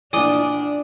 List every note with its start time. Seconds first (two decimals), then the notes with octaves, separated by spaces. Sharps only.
0.13 A#1 E3 D4 D5 G#5 D#6 G7